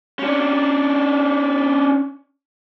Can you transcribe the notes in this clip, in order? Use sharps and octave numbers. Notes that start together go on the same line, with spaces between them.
C#4 D4